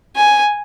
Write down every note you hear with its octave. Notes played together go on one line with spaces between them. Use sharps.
G#5